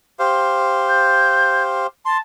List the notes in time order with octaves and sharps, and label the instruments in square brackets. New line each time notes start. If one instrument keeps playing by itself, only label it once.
[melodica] G4 C5 F5
[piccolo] G6
[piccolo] A5 [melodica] C6